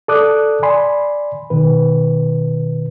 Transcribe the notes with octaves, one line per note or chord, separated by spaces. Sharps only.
A4 D5 D6 D#6 F#6
D5 G#5 B5 C6
B2 D#3 B4